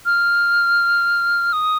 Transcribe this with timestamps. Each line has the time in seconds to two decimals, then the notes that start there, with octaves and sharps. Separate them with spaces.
0.06 F6
1.53 D#6